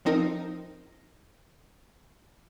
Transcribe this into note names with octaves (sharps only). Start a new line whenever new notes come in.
F3 C4 D#4 A#4